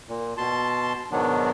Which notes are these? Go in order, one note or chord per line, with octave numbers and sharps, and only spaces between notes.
A#2
B2 A5 C6
G#2 B2 D#3 F#3 B3 D4